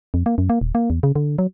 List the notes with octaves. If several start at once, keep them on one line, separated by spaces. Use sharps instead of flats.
F2
A#3
F#2
A#3
D#1
A#3
E2
C#3
D3
F#3